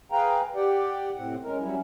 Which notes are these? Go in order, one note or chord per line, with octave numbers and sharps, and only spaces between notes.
G#4 B4 F5 G5 A#5
G4 D5 F#5 G5
A2 C3 C4 F#5
G#3 C#4 A#4
F#3 G3 C#4 E4